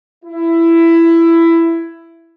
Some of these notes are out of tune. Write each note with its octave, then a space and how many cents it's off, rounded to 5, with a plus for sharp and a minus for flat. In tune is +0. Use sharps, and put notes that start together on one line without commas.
E4 +15